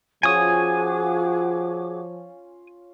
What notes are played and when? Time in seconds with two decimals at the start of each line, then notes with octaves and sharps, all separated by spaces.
0.23 F3 C#4 F4 F#4 G#4 G#5 D6 D#6